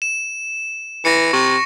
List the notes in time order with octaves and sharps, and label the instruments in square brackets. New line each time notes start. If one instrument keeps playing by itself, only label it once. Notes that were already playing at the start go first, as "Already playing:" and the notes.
[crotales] E7
[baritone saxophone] E3 [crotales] A#6 C#7
[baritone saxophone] C3 [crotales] C#6